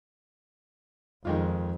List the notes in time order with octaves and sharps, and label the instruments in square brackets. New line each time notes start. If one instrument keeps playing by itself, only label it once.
[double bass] F2 [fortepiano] D#3 G#3 F4